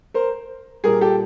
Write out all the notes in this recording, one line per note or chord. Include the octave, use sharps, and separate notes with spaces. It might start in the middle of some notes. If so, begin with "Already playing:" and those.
A#4 C5
A#2 G3 G#4 A#4
G4 A4